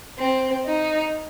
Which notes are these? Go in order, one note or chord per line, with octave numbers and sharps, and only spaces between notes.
C4
D#4